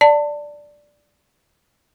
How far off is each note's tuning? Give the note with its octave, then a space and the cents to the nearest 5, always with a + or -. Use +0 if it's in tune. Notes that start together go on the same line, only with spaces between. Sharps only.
D5 +0 A5 +25